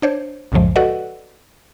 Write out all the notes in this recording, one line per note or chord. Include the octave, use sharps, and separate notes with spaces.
D4 C5 C#5
C2 F#2 A2 C#3 F3 G#3
F#4 A4 B4 D5 D#5 F#5